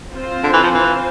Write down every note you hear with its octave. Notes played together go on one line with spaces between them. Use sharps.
C4 F4 C5
D3
E3
F3
E3